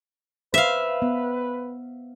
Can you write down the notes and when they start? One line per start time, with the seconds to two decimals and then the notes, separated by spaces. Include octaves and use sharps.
0.54 B4 C5 E5 F5
1.02 B3